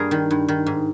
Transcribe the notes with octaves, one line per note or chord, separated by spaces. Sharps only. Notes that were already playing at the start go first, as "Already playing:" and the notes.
Already playing: G2 G#4 A#4
D#3
G2
D#3
G#2